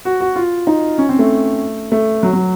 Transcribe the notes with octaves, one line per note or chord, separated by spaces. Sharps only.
F#4
F#4
F4
D#4
C#4
C4
A3
A3
F#3
F#3